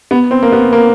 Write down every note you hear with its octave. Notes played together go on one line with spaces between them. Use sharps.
B3
C4
A#3
B3
A#3